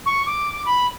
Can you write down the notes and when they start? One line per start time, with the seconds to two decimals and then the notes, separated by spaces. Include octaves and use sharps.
0.06 C#6
0.26 D6
0.66 B5